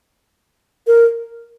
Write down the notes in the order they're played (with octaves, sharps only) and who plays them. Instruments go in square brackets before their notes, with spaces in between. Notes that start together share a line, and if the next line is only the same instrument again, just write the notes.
[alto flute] A#4